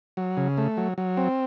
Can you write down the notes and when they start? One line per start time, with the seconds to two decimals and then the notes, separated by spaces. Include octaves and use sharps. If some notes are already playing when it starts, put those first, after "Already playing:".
0.17 F#3
0.37 C#3
0.58 A3
0.77 F#3
0.98 F#3
1.17 C4